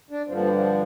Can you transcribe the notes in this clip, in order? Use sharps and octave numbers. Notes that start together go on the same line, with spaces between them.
D4
G2 D3 F3 C4
A#3
G3
F3